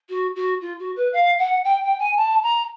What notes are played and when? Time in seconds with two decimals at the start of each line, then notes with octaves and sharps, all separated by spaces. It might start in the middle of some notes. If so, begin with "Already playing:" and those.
0.09 F#4
0.35 F#4
0.61 F4
0.79 F#4
0.96 B4
1.13 F5
1.38 F#5
1.64 G5
1.82 G5
1.99 G#5
2.16 A5
2.43 A#5